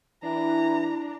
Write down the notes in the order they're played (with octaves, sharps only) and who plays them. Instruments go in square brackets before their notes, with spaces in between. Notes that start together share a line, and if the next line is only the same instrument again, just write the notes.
[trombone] E3 [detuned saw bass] D4 [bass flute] E4 [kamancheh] A#5